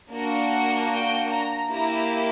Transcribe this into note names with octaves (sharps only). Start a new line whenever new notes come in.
A#3 D4 F#4
F#5
G5
A#5
A#3 E4 G4 A#5